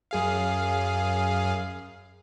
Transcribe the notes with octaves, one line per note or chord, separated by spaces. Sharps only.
F#2 G#4 F5